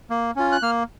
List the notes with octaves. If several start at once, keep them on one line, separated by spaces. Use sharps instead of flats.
A#3
C#4 F4
F#6
A#3 F6